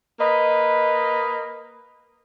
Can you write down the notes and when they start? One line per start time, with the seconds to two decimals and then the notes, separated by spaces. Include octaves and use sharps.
0.19 A#3 B4 D#5